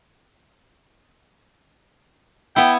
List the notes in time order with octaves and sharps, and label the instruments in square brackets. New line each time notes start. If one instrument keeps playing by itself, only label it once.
[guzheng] B3 E4 [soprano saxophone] G5